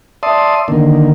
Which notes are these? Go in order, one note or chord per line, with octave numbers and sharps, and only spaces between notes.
D5 E5 A5 C6 D#6
D3 D#3 A#3